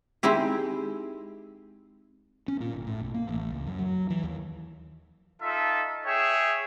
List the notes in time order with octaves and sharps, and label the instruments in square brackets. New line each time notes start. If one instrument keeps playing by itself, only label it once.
[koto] G#3 C4 D#4 E4 G4
[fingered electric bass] C#4
A#2
G1
A2
B1
A#3
A1
C#2
F#2
F#3
E3
D#2
[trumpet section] D#4 F4 A4 E5
G#4 C#5 E5 G5